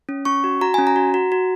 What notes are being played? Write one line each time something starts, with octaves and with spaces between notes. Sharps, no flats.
C#4
C#4 C#6
F#4
F#4 A#5
C#4 G#5
A#5
F#4
F#4
F#4